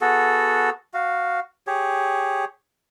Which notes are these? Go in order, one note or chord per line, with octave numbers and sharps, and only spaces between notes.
B3 F#4 G#4 A4
F#4 F5
G4 G#4 C#5